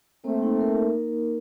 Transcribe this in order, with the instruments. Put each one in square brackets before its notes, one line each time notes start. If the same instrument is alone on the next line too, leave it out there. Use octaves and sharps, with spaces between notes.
[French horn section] A3 C4 [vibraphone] A#3
[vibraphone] D#4
A#4